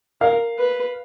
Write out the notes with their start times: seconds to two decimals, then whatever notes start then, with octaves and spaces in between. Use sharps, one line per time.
0.21 A#4 F5
0.58 B4